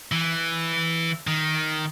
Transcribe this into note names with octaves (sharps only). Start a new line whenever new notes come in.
E3
D#3